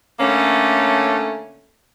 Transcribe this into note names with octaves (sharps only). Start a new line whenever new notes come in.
D3 A3 A#3 C#4